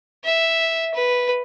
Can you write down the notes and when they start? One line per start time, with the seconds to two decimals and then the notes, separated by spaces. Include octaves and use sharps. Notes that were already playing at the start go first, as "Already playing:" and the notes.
0.24 E5
0.95 B4